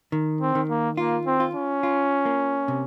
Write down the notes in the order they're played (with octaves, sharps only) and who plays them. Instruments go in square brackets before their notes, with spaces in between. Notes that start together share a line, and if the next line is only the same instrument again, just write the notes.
[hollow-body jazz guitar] D#3
[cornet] C4
[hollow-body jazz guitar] D#3
[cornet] A#3
[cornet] A#3 [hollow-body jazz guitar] F4
[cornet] C4
[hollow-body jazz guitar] F4
[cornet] C#4
[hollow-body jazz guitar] F4
A#3
C3